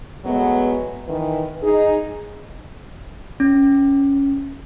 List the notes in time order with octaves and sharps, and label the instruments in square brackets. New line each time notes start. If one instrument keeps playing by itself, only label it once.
[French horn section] F#3 G#3 A3 B3
D#3 E3 B4
D#4 G#4
[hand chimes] C#4